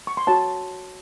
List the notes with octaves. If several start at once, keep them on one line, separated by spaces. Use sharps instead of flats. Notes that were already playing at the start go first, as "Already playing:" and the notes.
C#6
C6
F#4 C#5 A5